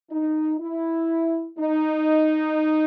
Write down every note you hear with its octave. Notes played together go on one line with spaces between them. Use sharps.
D#4
E4
D#4